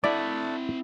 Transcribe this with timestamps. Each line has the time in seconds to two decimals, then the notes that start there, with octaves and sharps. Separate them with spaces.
0.04 A3 C4 D4 E4 A4 D5 F#5